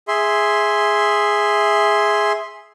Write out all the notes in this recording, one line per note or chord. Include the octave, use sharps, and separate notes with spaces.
G#4 E5 C6